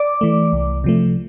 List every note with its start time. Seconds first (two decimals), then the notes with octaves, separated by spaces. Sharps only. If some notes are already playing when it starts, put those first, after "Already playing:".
Already playing: D5 D6
0.21 E3 A3
0.53 C2
0.84 C3 F3 A3